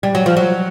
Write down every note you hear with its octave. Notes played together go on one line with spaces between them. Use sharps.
G3
F#3
F3
F#3